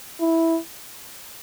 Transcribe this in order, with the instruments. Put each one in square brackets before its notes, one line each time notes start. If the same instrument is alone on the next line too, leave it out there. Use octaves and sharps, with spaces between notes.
[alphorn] E4